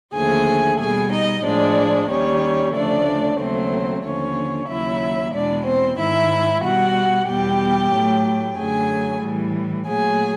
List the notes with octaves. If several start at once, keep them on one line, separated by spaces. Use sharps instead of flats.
D#2 D3 F3 A3 G#4 G#5
B2 G3 G#4 G#5
D#4 D#5
A2 F3 G#3 D4 D5
D#2 D#3 G3 C#4 C#5
D2 C#3 F3 A3 D4 D5
D#2 C#3 F#3 A3 C4 C5
D#2 D3 F3 C#4 C#5
D#2 C#3 F#3 E4 E5
E2 B2 G#3 D4 D5
C4 C5
G#2 D#3 G#3 E4 E5
B2 G3 F#4 F#5
E2 B2 G3 G4 G5
A2 F#3 A3
F#2 D3 F#3 A3 G#4 G#5
A2 E3 G3
A#2 F#3 A3 G#4 G#5